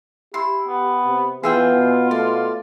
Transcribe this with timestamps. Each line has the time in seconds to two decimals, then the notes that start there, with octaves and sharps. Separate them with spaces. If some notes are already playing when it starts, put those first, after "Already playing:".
0.34 E4 G4 C6
0.67 B3
1.05 C3
1.43 E3 B3 F4 G#4 E5 G5
1.76 B2
2.11 A3 D5